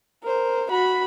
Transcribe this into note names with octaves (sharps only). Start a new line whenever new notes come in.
A#4 C5
F#4 B5